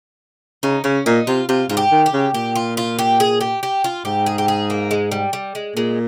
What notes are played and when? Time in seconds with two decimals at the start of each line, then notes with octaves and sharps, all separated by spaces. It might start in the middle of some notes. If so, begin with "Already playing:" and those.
0.63 C#3 D#4
0.84 C#3 C#4
1.06 A#2 D#4
1.27 C3 F4
1.48 C3 F4
1.69 G#2 F4
1.77 G4
1.91 D#3
2.06 G4
2.13 C#3
2.34 A#2 G4
2.55 F4
2.77 F4
2.99 G4
3.20 G#4
3.41 G4
3.63 G4
3.84 F4
4.05 G#2 G4
4.26 G#4
4.38 G4
4.48 G#4
4.70 A#3
4.91 G#3
5.11 G3
5.33 G3
5.55 G#3
5.76 A#2 G#3